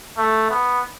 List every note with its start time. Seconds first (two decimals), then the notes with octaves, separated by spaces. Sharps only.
0.17 A3
0.50 B3